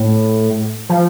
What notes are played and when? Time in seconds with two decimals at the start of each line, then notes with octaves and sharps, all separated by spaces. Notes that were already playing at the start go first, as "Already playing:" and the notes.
Already playing: A2
0.89 F3